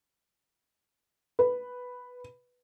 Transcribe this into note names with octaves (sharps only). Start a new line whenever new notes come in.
B4